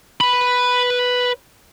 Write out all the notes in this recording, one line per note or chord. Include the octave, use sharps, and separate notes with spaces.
B4 B5